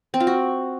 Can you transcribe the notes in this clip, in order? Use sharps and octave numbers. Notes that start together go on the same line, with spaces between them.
C4
F4
F#4